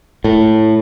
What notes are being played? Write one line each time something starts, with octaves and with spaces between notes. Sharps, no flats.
A2